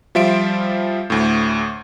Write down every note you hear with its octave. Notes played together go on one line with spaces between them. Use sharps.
F3 G3 F4 E5 C6 D7
D2 A2